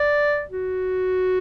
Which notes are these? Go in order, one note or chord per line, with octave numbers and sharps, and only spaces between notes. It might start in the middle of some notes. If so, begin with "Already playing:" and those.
Already playing: D5
F#4